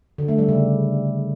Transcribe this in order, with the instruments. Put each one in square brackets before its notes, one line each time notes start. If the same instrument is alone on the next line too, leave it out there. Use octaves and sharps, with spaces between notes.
[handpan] D3
A3
G3
C#3